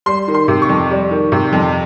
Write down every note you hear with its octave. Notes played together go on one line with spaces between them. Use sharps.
G3 C6
D#3
C6
C3
C#6
F2
G3
D#3
C3
F2